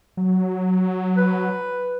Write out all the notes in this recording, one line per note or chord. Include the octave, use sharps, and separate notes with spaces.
F#3
B4